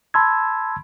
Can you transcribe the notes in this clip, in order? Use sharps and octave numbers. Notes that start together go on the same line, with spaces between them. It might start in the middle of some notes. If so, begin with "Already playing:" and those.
A5 B5 C6 E6 G#6